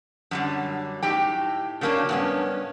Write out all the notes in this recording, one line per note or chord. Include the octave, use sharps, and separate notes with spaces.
F#2 D3 G3
A2 D#4 G4 G5
C#3 F#3 A#3 C#4 D4
G2 B3 C#4